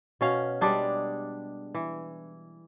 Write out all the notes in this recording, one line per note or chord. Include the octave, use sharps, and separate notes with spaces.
B2 C#4 F5
G3 G#3 D4 G#4
E3